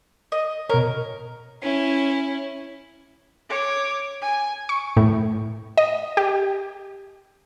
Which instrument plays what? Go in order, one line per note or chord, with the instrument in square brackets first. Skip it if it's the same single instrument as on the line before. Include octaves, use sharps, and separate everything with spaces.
[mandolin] D#5
[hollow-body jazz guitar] B2 C#5 [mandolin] A#4
[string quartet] C#4 E4
[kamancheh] C#5 D6
G#5
[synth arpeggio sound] C#6
A2
D#5
G4